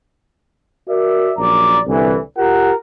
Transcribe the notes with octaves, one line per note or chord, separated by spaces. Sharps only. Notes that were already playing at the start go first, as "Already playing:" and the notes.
F#4 A#4 D5 E5
A#1 F#2 D5 A#5
C2 D3 E3
F4 G4 A#4 F#5